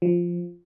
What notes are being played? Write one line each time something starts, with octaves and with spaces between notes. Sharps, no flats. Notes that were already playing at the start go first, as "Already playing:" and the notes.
F3